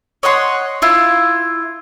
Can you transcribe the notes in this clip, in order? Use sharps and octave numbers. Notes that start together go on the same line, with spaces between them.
C#5 D#5 F#5 C6
E4 F4